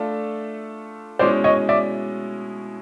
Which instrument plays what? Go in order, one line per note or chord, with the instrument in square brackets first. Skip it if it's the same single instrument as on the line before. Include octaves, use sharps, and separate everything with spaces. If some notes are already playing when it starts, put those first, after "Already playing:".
Already playing: [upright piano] A3 D4 F4 A4
[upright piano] B2 G#3 C#4 E4 [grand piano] C5 D5
[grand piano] C#5 D#5
D5 E5